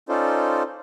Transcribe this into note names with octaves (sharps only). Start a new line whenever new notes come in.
C#4 D#4 F4 A4 C5 D5